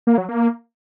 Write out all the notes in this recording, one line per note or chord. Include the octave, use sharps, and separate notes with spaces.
A#3
F#3
A#3